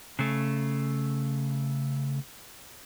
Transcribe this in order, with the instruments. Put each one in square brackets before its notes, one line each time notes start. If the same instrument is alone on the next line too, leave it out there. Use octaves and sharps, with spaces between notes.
[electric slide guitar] C#3 A3